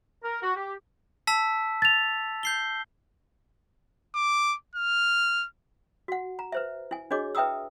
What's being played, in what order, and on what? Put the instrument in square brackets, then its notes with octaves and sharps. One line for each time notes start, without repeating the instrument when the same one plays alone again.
[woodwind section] A#4
F#4
G4
[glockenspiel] A5 E6 B6
[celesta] A6 F7
[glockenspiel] G6 C7 G7
[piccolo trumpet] D6
F6
[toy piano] F#4 F#5
A#5
B4 C5 E5
E4 G#5
D4 F#4 G#4 C#5 D#5 D6
B4 E5 G5 A#5 D#6 E6